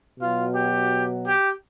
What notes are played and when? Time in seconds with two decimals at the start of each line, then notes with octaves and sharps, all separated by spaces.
0.20 B2 F#3 F4
0.55 G4
1.25 G4